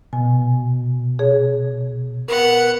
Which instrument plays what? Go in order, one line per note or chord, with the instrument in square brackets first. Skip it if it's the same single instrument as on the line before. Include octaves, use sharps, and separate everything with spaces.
[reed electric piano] B2 [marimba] G#5
[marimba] G#4 C#5
[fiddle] B3 F#5 [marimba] A#4